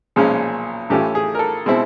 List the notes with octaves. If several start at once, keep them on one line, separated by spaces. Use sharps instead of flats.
B1 A#2 F3 G#3 C#4 G#4
A2 E3 A3 C#4 F4 G4
G#4
A#4
A4
B2 G#3 C4 E4